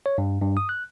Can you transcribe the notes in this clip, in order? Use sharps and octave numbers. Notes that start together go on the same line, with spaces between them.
C#5
G2
G2
D#6
F#6